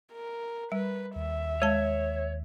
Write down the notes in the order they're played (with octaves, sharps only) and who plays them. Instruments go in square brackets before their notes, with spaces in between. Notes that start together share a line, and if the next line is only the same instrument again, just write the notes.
[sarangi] A#4
[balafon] G3 [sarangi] B4
[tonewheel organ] D#2 [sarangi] E5
[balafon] G#3 A5 [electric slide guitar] C#5